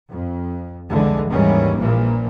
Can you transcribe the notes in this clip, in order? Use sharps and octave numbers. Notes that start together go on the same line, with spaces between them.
F2
C2 F2 D3 E3 G#3
D#2 G#2 D#3 E3 G3 C#4
A#1 A#2 E3 F3 A#3